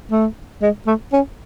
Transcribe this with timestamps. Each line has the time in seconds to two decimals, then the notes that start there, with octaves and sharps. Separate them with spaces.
0.11 A3
0.62 G#3
0.87 A3
1.13 C#4